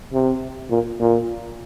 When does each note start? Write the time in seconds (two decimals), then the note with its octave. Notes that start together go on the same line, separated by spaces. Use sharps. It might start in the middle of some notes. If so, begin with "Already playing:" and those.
0.13 C3
0.71 A#2
1.00 A#2